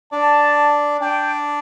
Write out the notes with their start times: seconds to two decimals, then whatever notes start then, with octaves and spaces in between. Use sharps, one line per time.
0.12 D4 D5 A5
1.01 D4 D5 G5